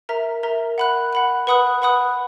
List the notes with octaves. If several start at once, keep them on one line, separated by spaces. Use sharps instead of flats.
A#4 E5 A#5
A#4 E5 A#5
F#5 B5 F#6
F#5 B5 F#6
B4 F#5 B5 D#6 F#6
B4 F#5 B5 D#6 F#6